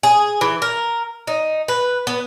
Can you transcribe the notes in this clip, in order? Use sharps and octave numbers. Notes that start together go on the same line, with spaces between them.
G#4
E3
A#4
D#4
B4
B3